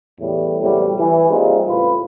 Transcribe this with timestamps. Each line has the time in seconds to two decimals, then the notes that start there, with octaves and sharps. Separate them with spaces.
0.20 E2 A2 G3
0.62 E2 A2 C3 F#3 G3
0.99 E3
1.30 G3 G#3 A#3 C4 D#4 F4
1.68 C#2 A2 F4 B4